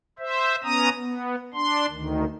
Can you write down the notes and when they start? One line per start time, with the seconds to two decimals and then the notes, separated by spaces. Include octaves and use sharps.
0.19 C5 E5
0.64 B3 C#4 A#5 D#6
1.00 B3
1.54 D4 C6
1.90 D2 D#3